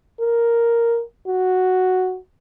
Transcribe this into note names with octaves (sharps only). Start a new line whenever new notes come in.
A#4
F#4